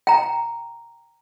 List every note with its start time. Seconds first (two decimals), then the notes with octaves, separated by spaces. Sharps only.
0.07 G5 A#5